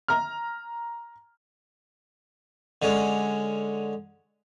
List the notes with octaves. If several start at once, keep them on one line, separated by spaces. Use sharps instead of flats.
A#5 F6
D3 G#3 C#4